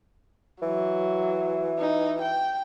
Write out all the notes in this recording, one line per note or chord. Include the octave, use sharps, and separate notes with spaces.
E3 F#3
D#4
G5